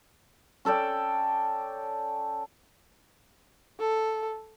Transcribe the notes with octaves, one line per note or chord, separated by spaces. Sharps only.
C#4 A4 D5 G5
A4